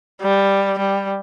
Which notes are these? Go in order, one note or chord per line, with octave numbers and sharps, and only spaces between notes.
G3
G3